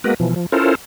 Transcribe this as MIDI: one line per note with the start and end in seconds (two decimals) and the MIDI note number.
0.04 0.14 56
0.04 0.14 58
0.04 0.14 59
0.04 0.14 66
0.04 0.14 70
0.04 0.14 71
0.20 0.34 47
0.20 0.34 52
0.20 0.34 53
0.36 0.46 53
0.52 0.75 61
0.52 0.75 64
0.52 0.75 65
0.52 0.75 69
0.52 0.75 70
0.52 0.75 72